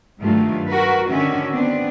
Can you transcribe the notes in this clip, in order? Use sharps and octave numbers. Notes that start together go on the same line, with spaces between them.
G2 D#3 F#3 G3 A3 F4
F#4 A#4 B4
D3 D#3 C#4 F#4 E5
B3 C4 D4